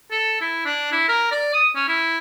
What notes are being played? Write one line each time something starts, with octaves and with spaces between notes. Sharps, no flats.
A4
E4
D4
E4
A#4
D5
D#6
C#4
E4